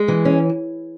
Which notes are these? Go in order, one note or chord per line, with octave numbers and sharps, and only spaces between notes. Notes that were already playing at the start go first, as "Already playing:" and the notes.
Already playing: G#3
E3
C#4